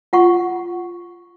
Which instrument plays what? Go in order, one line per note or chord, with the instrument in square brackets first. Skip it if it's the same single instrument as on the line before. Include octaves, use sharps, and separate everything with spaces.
[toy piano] F4 F#5 C#6